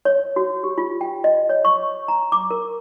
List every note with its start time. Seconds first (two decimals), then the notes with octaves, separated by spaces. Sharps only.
0.05 C#5
0.36 F#4
0.64 G4
0.78 F4
1.01 G5
1.24 D#5
1.49 C#5
1.65 C#6
2.08 A#5
2.32 D6
2.51 A#4